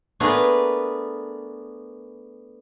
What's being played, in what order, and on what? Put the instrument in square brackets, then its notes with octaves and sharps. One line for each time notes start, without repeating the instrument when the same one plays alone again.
[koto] A3 B3 D4 G#4 A#4 B4